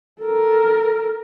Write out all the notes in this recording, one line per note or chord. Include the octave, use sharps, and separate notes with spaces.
A4 A#4